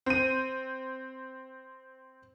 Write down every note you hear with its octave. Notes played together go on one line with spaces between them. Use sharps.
C4 D#7